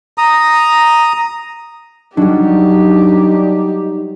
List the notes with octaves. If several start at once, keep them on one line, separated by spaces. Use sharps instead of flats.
A#5 D#6
F#3 G3 D4 D#4 G4